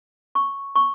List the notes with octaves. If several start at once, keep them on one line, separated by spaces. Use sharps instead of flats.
C#6
C#6